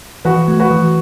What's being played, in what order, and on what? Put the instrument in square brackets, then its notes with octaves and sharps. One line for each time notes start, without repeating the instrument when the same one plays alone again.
[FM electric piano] E3 [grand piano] F#4 B4
[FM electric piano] A3
[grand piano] F#4 B4
[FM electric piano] E3